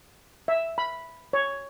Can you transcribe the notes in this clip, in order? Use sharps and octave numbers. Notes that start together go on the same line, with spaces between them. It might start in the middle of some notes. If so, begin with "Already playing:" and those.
E5
B5
C#5